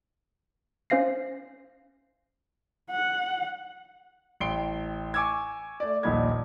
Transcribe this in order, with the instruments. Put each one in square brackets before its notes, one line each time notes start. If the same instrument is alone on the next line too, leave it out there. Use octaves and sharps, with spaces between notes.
[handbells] C#4 C5 F5 A#6 C7
[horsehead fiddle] F#5
[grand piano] A1 G5 C6 C7 D7 G7
G#5 C#6 D6 E6 G#6
A3 D5
D#1 A#1 A#2 D#4 B5 G#6